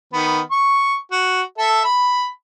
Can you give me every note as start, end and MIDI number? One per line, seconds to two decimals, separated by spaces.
0.13 0.40 51
0.13 0.40 59
0.51 0.95 85
1.12 1.42 66
1.58 1.81 69
1.58 1.81 76
1.84 2.28 83